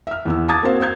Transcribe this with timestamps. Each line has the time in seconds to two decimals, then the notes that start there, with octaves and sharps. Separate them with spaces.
0.07 E5 F6
0.25 E2 B3 E6
0.48 A5 A#5 D6 D#6 G#6 A6
0.63 A#3 C4 F#4 C5 F5
0.80 C5 F5 G6 G#6